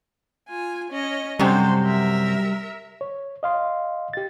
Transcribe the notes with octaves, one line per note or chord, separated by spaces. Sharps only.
F4 G#5
C#4 D#5
F#2 C3 G3 A4 C5
A#4 E5
C#5
D#5 F5 C6
G4 A6